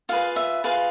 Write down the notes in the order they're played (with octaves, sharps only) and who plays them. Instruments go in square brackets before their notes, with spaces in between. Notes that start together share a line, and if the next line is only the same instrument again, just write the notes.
[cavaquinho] F4 G#4 B4 F5
E5
F4 G#4 B4 F5